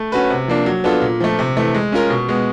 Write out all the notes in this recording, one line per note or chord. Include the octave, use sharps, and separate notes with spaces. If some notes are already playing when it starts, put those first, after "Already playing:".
Already playing: A3
C#4 F#4 B4
C3
F3 A#3 D4
F#3
B3 D4 F4 A4
A#2
F3 A3
C3
E3 A3
G#3
C#4 F4 A#4
B2
G#3 B3